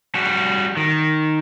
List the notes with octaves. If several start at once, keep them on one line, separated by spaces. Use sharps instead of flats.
G3 F#4
D#3